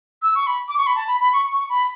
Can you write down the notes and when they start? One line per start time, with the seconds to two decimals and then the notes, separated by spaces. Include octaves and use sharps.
0.22 E6
0.35 C#6
0.47 B5
0.68 D6
0.78 C#6
0.87 B5
0.96 A5
1.08 B5
1.21 B5
1.33 C#6
1.51 C#6
1.70 B5